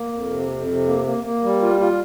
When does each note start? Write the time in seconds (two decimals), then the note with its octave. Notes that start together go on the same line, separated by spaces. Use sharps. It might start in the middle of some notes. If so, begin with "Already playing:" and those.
Already playing: A#3
0.12 F2
0.31 C3
0.49 F2
0.67 C3
0.87 A#3
1.05 A#3
1.24 A#3
1.43 G3
1.62 F4
1.80 F4